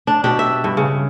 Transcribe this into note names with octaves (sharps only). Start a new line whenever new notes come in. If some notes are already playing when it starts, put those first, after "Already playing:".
D4
B2 D4 G4
E5
G2
C#3